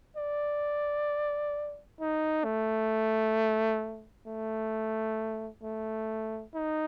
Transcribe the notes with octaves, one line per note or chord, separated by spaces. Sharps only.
D5
D#4
A3
A3
A3
D#4